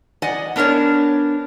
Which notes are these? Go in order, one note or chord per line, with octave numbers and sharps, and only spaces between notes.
D5 D#5 F#5 G#5
B3 D4 A#4 B4 C#5